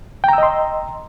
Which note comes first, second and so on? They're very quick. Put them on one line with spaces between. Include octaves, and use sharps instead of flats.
G5 A#5 E6 D#5 C6